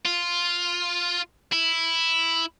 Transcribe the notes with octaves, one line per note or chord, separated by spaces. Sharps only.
F4
E4